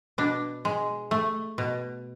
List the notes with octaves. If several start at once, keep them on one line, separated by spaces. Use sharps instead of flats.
B2 D4
G#3
A3
B2